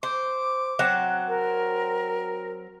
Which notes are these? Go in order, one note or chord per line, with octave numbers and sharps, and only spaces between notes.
C5 D6
F#3 C4 F#5
A#4